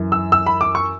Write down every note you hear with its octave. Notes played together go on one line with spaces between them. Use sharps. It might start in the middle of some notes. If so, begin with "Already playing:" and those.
Already playing: F#2 E3
E6
E6
B5
D6
C#6